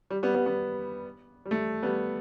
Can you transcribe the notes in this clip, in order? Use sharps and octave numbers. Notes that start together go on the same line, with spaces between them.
G3
G3 B3
G3 B3
G3 B3
G3
A3
G3 B3